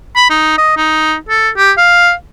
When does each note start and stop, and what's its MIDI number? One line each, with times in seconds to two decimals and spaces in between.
0.16 0.25 83
0.30 0.55 63
0.58 0.74 75
0.77 1.16 63
1.29 1.50 69
1.57 1.72 67
1.78 2.12 77